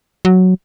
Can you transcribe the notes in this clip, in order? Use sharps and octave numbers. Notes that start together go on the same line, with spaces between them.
F#3